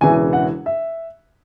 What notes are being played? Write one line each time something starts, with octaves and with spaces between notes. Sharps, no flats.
E1 E2 C#3 E3 G#5
F#5
E5